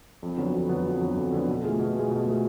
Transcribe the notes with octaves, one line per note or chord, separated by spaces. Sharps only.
F2
D3 F#3 B3
F2
D3 F#3 B3
F2
D3 F#3 B3
F2
D3 F#3 B3
B2
A3 F4 G#4
B2
A3 F4 G#4
B2
A3 F4 G#4